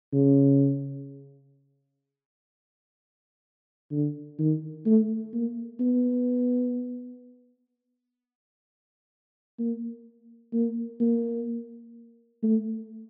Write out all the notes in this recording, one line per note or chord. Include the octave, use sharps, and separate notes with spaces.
C#3
D3
D#3
A3
A#3
B3
A#3
A#3
A#3
A3